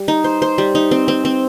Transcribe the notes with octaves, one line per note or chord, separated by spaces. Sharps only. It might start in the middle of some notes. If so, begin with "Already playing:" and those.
Already playing: G3
D#4
C5
C5
G3
D#4
C4
C4
C4